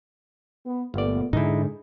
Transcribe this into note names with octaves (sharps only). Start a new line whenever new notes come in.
B3
G1 A#2 A3 B3 D5
G#2 D3 G#3 D#4 E4